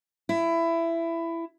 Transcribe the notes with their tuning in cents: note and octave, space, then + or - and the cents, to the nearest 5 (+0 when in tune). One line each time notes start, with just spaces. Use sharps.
E4 +15